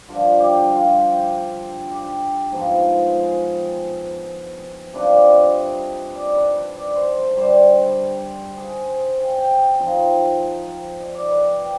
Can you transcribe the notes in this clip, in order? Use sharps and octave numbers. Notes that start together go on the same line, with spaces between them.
G2 D3 F3 F4
G4
F4
G4
G#2 F3 B3
G#4
C3 G3 D4 F4 B4
D5
D#5
D5
B4
B4
D5
C5
C5
G2 D3 G3 C5
G#4
C5
G5
G5
G5
F3 C4 D#4
D#5
D5
B4
G5